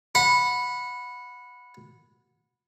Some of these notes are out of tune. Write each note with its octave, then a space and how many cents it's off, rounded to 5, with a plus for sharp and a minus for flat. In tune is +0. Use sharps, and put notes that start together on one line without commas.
F#5 -25 B5 +0